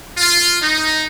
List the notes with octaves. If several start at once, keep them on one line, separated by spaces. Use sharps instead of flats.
F4
D#4